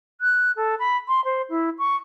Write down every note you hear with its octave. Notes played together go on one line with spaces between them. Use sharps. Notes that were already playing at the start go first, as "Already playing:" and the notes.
F#6
A4
B5
C6
C5
E4
C#6